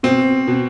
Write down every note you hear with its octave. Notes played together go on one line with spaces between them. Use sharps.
B2 C4
B2